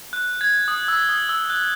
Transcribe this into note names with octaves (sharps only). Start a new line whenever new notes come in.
F#6
G#6
D#6
E6
D#6
E6
F#6